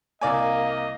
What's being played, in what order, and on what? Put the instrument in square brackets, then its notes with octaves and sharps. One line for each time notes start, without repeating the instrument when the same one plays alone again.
[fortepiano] C2 D5 G#5 [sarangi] A#3 [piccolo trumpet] D#5